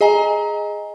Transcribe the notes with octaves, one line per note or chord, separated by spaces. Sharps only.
G#4 D#5 G#5 A#5